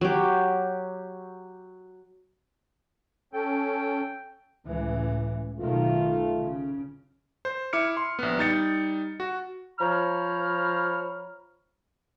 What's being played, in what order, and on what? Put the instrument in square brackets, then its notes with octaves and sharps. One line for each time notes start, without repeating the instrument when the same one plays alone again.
[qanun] F#3 G4
[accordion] C#4 A4 [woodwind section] G5
[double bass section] C#2 A2 E3
[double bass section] B1 D#3 [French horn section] A3 F4
[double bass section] C#3
[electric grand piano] C5
E4 D6 F6 C#7
C6
A#1 B3
G3 D#4 A6 C#7
F#4
[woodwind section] F3 C5 C#5 A#5 B5 F6